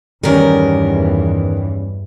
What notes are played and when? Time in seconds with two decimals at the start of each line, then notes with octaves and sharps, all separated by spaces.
0.23 E2 G2 D#3 E3 G3 C#4 A#4